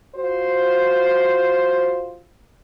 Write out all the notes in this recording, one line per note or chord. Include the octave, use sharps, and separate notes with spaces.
F4 F#4 C5